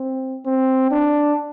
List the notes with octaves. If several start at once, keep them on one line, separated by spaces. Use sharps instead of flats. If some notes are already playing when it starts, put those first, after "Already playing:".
Already playing: C4
C4
D4